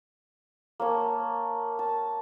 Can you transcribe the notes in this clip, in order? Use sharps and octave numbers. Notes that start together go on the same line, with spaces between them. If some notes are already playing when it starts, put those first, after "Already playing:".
A#3 C#5 A5
A5